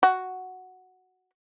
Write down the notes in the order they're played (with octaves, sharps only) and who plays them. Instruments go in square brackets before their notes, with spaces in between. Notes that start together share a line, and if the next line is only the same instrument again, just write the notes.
[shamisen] F#4